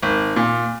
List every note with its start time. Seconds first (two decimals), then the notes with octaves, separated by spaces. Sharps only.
0.03 G#1
0.36 A#2